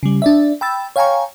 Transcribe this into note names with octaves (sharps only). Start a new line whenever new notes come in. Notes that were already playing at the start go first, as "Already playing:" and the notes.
C#3 G3
D4 D5 E5
G5 B5 E6 A6
C#5 F5 G5 G#5 A#5 C#6